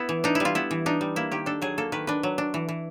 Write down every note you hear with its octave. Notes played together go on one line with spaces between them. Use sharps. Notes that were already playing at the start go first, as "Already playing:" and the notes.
Already playing: B3 E4
E3
D4 D#4
G3 E4
F4
B3 E4
E3
D4 D#4
G3
A#3 E4
D#3 G4
D4 A4
F#3 G#4
A#3 A4
D#3 B4
D4 B4
F#3
D4
E3
E3